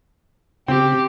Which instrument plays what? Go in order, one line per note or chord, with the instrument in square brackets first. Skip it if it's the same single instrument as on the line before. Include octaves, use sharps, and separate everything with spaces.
[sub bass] C#3 [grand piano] C4 [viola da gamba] G4